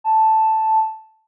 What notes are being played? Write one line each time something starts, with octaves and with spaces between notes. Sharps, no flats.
A5